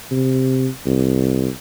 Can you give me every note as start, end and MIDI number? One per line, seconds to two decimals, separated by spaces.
0.11 0.68 48
0.86 1.48 36